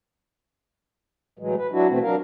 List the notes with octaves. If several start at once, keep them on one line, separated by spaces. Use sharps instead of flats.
A2 E3 F#3 G#3
B4
F#3 D4 E4 F#4
B2 E3 A3 C4
F#3 D4 A#4 F5